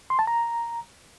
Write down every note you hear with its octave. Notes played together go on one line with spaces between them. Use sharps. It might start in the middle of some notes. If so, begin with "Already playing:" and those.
C6
A5
A#5